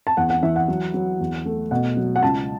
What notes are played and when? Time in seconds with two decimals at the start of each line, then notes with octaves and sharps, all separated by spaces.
0.07 A5
0.17 E2 F#5
0.30 F#5
0.43 E3 E5
0.56 F#5
0.68 F#3
0.94 F#3
1.20 E2
1.46 A3
1.71 B2 F#5
1.97 F#3
2.16 F#5
2.23 C#2 A5